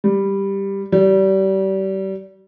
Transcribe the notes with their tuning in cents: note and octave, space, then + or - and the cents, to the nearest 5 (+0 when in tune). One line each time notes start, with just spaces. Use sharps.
G3 +5
G3 -30